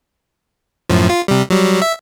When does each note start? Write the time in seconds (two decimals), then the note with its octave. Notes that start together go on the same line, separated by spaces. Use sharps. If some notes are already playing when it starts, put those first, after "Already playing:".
0.89 F#2 A2 F3
1.10 F4
1.28 C3 G3
1.50 F#3 G3
1.82 E5